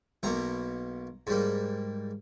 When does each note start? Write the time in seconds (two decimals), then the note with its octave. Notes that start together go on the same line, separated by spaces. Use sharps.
0.23 B1 B2 A#3 A#5
1.27 G#2 G3 A#3